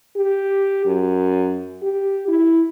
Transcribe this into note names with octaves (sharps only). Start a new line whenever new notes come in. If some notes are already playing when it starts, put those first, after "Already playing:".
G4
F#2
G4
E4